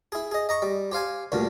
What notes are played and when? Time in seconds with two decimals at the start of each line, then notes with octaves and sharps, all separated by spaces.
0.12 E4 G#4
0.31 G#4 D#5
0.49 D#5 A#5 C#6
0.62 G3
0.92 G4 C5 F5 G#5
1.32 D2 G2 A#2 D3